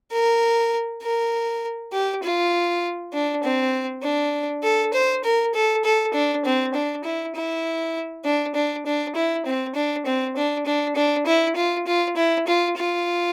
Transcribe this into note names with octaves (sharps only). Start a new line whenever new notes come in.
A#4
A#4
G4
F4
D4
C4
D4
A4
C5
A#4
A4
A4
D4
C4
D4
E4
E4
D4
D4
D4
E4
C4
D4
C4
D4
D4
D4
E4
F4
F4
E4
F4
F4